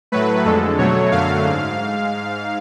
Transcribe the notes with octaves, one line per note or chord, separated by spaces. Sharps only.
A2 F#3 A3 B4
F2 D3 G#3 A4
B2 F#3 A3 C#5
F#2 D3 F#3 A3 F5
G#2